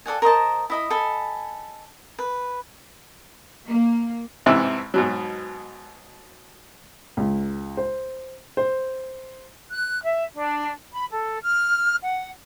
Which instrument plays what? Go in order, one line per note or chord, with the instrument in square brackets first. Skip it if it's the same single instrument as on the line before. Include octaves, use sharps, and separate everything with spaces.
[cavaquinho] A4 D5 F#5 G#5
A#4 C5 D#5 A5
E4 D#5 B5
A4 D#5 G#5 B5
B4
[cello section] A#3
[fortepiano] A1 G#2 C3 E3
G#2 B2 F#3
[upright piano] C#2
C5
C5
[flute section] F#6
E5
D4
B5
A4
F6
F#5